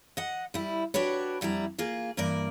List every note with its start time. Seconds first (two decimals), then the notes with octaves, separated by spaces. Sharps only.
0.17 D#5 F#5
0.54 G3 E4
0.94 D4 F#4 G4 B4 C#5
1.41 F2 G3 E4 A#5
1.78 A#3 F4 G#4
2.17 G2 E3 A#3 A#4 D5